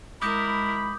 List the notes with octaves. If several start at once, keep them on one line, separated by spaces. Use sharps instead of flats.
G#3 E4 A#4 B5 D6 D#6 G6